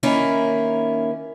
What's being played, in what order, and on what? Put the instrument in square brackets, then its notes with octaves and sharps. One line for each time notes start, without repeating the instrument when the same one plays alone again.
[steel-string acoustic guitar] D#3 A#3 C#4 E4